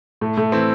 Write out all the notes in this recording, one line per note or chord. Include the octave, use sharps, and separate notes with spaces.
A2 A3
A2 A3
E3 C4 E4